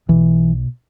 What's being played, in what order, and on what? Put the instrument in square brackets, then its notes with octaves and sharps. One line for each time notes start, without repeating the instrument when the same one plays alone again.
[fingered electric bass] B1 B2 E3